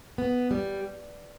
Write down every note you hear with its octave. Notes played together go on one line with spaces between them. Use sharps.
B3
G3